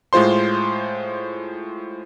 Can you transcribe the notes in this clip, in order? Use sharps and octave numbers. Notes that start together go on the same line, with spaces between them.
A2 G#3 F4 C5 C6